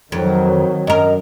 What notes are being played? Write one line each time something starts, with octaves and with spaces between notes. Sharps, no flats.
F2 D#3 F#3
F#2 A#4 D#5